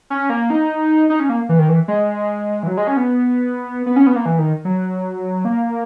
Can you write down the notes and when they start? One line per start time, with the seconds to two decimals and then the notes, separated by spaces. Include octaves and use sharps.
0.10 C#4
0.30 A#3
0.50 D#4
1.10 D#4
1.20 C#4
1.29 A#3
1.49 E3
1.59 D#3
1.69 E3
1.88 G#3
2.63 E3
2.67 F#3
2.77 G#3
2.87 C#4
2.97 B3
3.86 B3
3.96 C#4
4.07 B3
4.16 A#3
4.26 E3
4.39 D#3
4.65 F#3
5.45 A#3